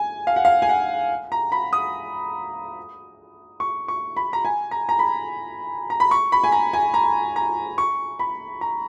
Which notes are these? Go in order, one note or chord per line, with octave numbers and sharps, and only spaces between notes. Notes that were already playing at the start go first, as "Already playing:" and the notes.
Already playing: G#5
F5
F#5
F5
G#5
F#5
A#5
B5
D#6
C#6
C#6
B5
A#5
G#5
A#5
A#5
B5
A#5
B5
C#6
B5
G#5
A#5
G#5
A#5
A#5
C#6
B5
A#5